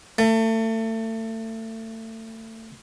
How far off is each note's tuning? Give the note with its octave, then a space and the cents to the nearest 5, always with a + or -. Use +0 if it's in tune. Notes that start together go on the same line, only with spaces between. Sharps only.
A3 +30